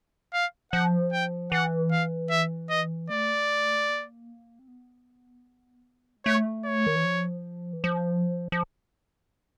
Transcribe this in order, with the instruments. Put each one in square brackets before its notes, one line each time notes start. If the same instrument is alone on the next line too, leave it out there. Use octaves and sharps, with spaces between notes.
[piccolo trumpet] F5
[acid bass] F3 [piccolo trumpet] F#5
[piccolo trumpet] G5
[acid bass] E3 [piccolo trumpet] F#5
[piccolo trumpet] F5
E5
D#5
[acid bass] A3 [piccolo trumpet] D5
[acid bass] A#3
C4
B3
G#3
[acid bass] A3 [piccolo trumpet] C#5
[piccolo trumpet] C#5
[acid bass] D#3
E3
F3
E3
F3
F3